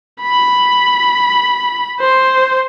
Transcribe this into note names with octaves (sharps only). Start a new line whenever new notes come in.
B5
C5